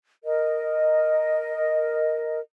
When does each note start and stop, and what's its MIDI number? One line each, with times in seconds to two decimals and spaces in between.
0.24 2.39 70
0.24 2.39 75